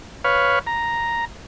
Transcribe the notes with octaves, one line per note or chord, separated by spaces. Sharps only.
B4 C#5 F5
A#5